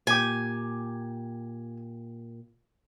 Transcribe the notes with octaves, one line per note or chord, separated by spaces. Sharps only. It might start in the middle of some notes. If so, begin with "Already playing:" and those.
A#2 G4 G#5